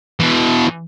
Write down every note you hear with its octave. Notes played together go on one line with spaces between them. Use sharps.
B2 E3